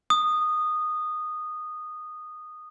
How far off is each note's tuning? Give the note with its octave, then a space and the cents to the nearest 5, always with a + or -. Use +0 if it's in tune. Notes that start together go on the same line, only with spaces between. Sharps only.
D#6 -15